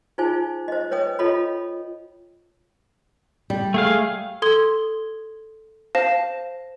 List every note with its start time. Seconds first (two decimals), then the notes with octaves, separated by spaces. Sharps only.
0.18 D#4 F4 G#4 C5 G#5
0.68 C5 D#5
0.91 B4 C#5 D#5 G5 D#6
1.19 F4 A4 C#5 D#5 B5
3.50 G3
3.74 A3 G#4 F5
4.42 A4 C6 D#6 G#6 G7
5.95 C5 F5 A5 A#6 E7